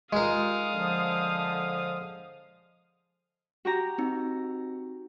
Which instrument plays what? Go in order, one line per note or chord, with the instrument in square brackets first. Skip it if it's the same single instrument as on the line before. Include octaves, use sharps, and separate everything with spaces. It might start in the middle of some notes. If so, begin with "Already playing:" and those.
[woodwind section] G3 D#4 F4 [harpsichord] G#3 A#4 [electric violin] F5 D#6
[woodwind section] D3 F3
[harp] F#4 G4 A#5
[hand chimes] C4 D#4